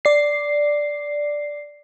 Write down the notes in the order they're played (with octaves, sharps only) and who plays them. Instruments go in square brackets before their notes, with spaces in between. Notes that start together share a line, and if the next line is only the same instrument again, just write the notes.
[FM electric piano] D5 C7